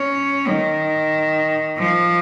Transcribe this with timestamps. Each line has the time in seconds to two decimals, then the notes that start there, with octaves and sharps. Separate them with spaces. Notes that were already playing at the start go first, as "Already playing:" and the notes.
Already playing: C#4
0.48 D#3
1.78 F3